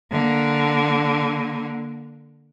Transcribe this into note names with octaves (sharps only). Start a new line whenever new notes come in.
D3 A#3